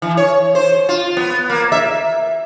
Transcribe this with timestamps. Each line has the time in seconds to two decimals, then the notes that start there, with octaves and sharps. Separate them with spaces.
0.02 E3
0.17 C#5
0.55 C5
0.89 F4
1.17 B3
1.50 A#3
1.72 E5